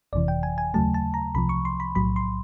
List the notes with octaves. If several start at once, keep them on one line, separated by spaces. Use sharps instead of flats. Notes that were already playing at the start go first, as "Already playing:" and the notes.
G1 F2 C3 E3 D5
G5
G#5
G#5
D#2 C#3 F#3 A3 A5
A5
A#5
C2 C3 F3 B5
C#6
C6
B5
B1 A2 F#3 B5
C6